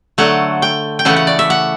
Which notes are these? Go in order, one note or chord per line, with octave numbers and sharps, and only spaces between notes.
D3 F#3 A3 F#5
G5
G5
C#3 E3 A3 F#5
F#5
D5
E5
F#5